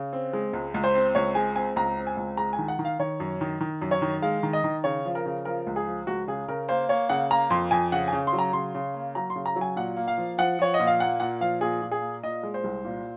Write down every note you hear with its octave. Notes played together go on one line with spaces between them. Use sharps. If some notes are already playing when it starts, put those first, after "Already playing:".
Already playing: C#3
C4
G#3
C#2
C#2
C5
C4
C#2 C#5
G#3 G#5
C4 G#5
C#2 A#5
C4
G#5
C#2
G#3 A#5
G#5
D#3
F#5
D#3
F5
D#3 C#5
F#2
D#3
D#3
F#2
C#5
D#3
G#3 F5
D#3
D#5
D#3
C#3 C#5
F3
A#4
C#3
F3 A#4
C#2
G#4
F3
C#2 F#4
C#3 G#4
C#3 A#4
A#3 C5
A#3 C#5
C#3 F#5
A#3 A#5
F2 C6
F2 G#5
C#3 F#5
G#5
C#3
C6
F#3
A#5
C#3 C6
C#3
A#3
F#3 A#5
C6
C#3
A#5
F#3
G#5
A#2 F#5
A#3
F5
F3
F3 F#5
F3 C#5
D#5
A#2
F5
A#3 F#5
A#2 F#5
F3 F5
A#2 G#4
A#2
G#4
A#3
A#2 D#5
G#3
C5
C2
A#2